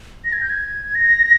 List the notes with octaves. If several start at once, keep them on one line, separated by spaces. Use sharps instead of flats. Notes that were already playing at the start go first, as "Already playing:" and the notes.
A#6
G#6
G6
G#6
A#6